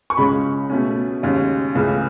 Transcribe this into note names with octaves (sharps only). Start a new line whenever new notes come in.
C#6
C#2 C#3 G#3 C#4 B5
B2 A3 C#4
D#2 C#3 G#3 C#4
C#2 C#3 E3 A3